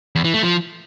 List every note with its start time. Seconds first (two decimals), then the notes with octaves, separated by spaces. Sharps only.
0.15 E2
0.25 E3
0.34 A3
0.43 F3